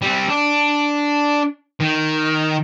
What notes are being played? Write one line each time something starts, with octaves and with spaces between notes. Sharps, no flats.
G3 C4
D4
D#3